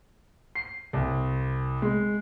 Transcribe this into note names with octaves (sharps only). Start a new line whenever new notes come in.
C7
C2
G#3